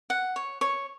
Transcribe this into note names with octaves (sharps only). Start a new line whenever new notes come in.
F#5
C#5
C#5